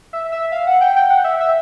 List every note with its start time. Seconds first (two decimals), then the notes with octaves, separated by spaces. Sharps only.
0.13 E5
0.32 E5
0.52 F5
0.67 F#5
0.81 G5
0.96 G5
1.10 F#5
1.24 E5
1.40 E5